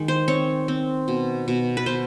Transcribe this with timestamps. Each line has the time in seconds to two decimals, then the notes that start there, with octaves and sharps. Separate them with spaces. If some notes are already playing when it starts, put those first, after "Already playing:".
Already playing: D#3 G#3
0.08 C5
0.28 C4 C#5
0.68 C4
1.08 B2
1.48 B2
1.77 B4
1.86 B2 C5